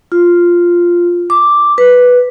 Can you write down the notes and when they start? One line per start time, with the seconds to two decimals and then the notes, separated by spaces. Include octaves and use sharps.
0.12 F4
1.30 D6
1.78 B4